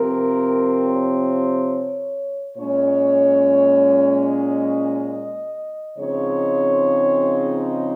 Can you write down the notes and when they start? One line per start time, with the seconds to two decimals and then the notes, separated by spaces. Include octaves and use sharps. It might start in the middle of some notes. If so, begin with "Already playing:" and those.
Already playing: C3 F3 C4 A#4
0.86 C#5
2.57 A#2 G#3 C#4 C#5
4.27 D#5
5.98 C#3 F3 G#3 C4 D#4 C#5